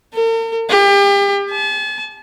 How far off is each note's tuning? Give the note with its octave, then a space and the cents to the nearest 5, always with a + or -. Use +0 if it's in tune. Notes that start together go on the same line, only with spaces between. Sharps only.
A#4 -45
G4 +35
A5 -40